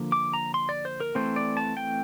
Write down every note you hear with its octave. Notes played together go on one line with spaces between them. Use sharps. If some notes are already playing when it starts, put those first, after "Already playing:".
Already playing: D3 F3 A#3
D6
A#5
C6
D5
C5
A#4
E3 A3 C4 C5
D5
A5
G5